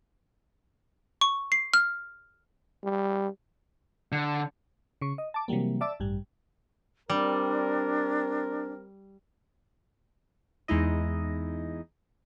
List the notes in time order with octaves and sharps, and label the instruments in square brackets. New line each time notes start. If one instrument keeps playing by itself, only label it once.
[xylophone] C#6
C7
F6
[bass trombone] G3
[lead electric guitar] D3
[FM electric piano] C#3 C#6
D#5
A5 D6
C3 E3 F#3 G3 A#3
D5 E5 A5 D6 E6
A1 G2 G3
[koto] G3 [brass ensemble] C4 A#4 [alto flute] D4
[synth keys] E2 G#3 D#4 E4 D#5